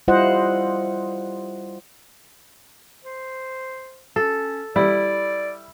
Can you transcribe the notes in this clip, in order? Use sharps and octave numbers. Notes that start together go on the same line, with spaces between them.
G3 E4 F4 C5 D#5 F#5
C5
C#4 A4
G3 E4 D5